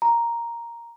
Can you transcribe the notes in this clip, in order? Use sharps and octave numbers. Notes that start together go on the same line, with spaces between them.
A#5